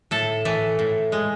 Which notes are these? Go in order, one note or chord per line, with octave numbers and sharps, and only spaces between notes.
A2 A4
E3 A3
A2
G#3